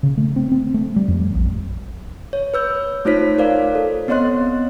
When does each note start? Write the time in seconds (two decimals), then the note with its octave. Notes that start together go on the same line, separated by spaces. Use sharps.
0.03 C#3
0.17 A3
0.36 C4
0.52 C4
0.74 A3
0.96 G3
1.08 F2
1.34 A#1
2.33 C#5
2.54 B4 E6 G6
3.05 A3 D#4 F4 C5 C#5 B6
3.38 A#4 C5 D5 F5
3.75 A4
4.08 B3 C4 C#5 D#5 C6 F#6